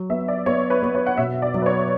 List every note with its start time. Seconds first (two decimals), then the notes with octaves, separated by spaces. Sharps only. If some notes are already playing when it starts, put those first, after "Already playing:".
Already playing: F#3
0.09 B3 E5
0.28 D5
0.46 B3 C#5
0.70 B4
0.82 B3
0.95 C#5
1.07 F#5
1.18 B2 E5
1.42 D5
1.54 F#3
1.62 B4
1.66 C#5